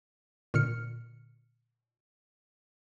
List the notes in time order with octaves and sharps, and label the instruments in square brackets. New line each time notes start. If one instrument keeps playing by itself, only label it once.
[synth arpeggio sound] A#2 D3 F6 C#7